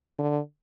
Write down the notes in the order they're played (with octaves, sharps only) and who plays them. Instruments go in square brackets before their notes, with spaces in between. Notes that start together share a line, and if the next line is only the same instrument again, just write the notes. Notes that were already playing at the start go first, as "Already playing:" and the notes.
[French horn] D3